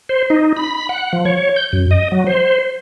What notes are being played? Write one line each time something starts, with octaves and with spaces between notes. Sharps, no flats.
C5
D#4
B5
F#5
F3
C#5
G6
F#2
D#5
F#3
C5